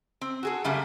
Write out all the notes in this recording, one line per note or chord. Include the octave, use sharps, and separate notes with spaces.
C4
F#4 G#4 A4
F#2 C#3 G3 A3 A#3